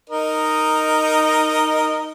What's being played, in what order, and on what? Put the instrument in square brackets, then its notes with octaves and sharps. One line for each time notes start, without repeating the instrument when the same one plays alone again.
[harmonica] D#4 A#4 D#5